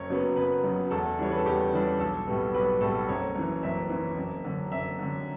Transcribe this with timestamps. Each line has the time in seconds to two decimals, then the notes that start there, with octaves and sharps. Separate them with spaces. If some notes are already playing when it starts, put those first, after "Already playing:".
Already playing: F#1 C#5
0.10 F#2 C#3 F#3 B3
0.36 F#1 B4
0.64 F#2 C#3 F#3 B3
0.91 E2 A4
1.18 C#3 E3 G3 D4 C#5
1.31 B4
1.38 A4
1.46 E2 G4
1.73 C#3 E3 G3 D4
2.00 B1 A4
2.27 A2 G3 B3
2.54 B1 B4
2.81 A2 G3 B3 A4
3.09 F#1 C#5
3.36 F#2 E3
3.63 F#1 E5
3.90 F#2 E3
4.17 F#1
4.44 F#2 D3
4.72 F#1 E5
4.99 F#2 D3